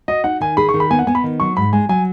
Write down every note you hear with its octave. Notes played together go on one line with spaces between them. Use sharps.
F#4 D#5
D#4 F#5
D#3 G#5
G#4 B5
C#6
D#3
B5
B3 G#5
F#5
B3 G#5
B5
D#3
F#3 C#6
G#2 B5
G#3 G#5
F#3 G#5